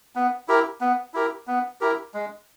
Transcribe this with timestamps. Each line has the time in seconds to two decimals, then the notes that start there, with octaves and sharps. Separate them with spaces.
0.15 B3
0.48 E4 G4 A#4
0.81 B3
1.14 E4 G4 A#4
1.47 B3
1.81 E4 G4 A#4
2.14 G#3